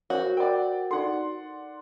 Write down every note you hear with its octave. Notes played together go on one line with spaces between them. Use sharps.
F#4 A#4 C5 C#5
A#4 D5 F#5 G5
D#4 A4 D5 F#5 C6